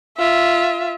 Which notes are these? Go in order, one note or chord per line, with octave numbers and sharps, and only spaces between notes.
F4 E5